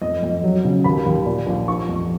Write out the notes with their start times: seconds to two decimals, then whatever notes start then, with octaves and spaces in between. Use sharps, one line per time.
0.02 F2 D#5
0.23 F2
0.44 F#3
0.64 C#3
0.84 D#2 B5
1.06 D#2
1.26 A#2
1.47 A#1
1.68 F3 C#6
1.89 F2